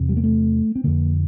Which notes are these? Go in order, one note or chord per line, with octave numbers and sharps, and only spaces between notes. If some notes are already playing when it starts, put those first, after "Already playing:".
Already playing: E2 C3
G3
A#3
A3
C4
F2 D3 A#3